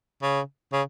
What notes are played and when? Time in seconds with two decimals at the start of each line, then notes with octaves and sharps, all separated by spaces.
0.23 C#3
0.73 C#3